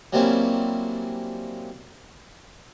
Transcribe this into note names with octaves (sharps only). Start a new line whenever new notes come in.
F#3 G3 A#3 C4 C#4 E4